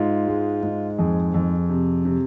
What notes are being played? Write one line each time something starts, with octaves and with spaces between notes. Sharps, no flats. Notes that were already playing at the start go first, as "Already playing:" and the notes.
Already playing: G#2 F4
G#3
G#2
F2 G#4
F2
C3
C3